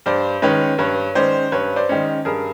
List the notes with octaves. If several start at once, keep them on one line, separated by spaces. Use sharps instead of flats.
G2 C5 D5
D#3 G#3 C#4 B4 C#5
G2 B4 C#5
D#3 G#3 C#4 C5 D5
G2 B4 C#5
C5 D5
D#3 G#3 C#4
G2 G#4 A#4